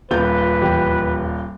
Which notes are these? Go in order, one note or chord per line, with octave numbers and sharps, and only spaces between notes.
D#1 F4 B4 G6
E2 G4